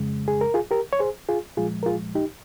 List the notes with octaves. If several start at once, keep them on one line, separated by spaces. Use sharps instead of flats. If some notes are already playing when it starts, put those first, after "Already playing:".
Already playing: F2 C#3 G#3
G#4
A#4
F4 G#4
G4 A#4
C#5
G#4 C5
F4 G#4
A#2 F3 G#3 F4 G#4
A#4
F4 G#4
D#4 G4